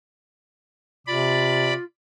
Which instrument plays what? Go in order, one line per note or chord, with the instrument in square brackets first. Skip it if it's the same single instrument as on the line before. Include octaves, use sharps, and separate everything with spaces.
[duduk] C3 [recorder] F4 [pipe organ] D5 B5